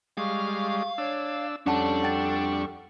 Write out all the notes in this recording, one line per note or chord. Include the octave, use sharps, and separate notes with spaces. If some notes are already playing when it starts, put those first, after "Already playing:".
G3 G#3 F5 C#6
D4 C#5 E6
F2 G3 C#4 D4 A4 F#5 A5 C#6
F#5 G5 A6